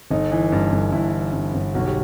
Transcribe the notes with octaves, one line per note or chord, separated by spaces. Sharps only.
G1 D#4
E3
G2
G1
G1 E4
E3
G2
G1
B1 F#4
G4